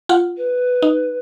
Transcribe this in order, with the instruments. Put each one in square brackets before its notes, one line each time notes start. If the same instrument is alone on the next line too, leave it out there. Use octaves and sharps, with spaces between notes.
[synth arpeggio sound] F4 F#5
[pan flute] B4
[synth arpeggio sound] D#4